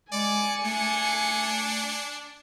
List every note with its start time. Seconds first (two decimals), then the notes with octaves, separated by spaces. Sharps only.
0.12 G#3 D5 G#5 C#7
0.65 A3 D4